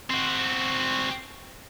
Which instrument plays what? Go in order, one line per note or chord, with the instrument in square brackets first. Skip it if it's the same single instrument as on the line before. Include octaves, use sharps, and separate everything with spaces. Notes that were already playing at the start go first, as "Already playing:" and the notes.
[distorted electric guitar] C4 F#4